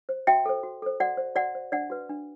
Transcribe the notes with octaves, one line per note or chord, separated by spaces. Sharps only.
C5
F#4 E5 G5
A4 C5
F#4
A4 C5
F#4 D5 F#5
C5
F#4 D5 F#5
C5
D4 D5 F#5
F#4 B4
D4